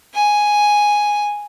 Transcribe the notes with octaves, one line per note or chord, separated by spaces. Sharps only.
G#5